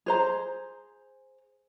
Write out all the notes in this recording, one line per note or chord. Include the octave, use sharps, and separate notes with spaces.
G#4 C5 A#5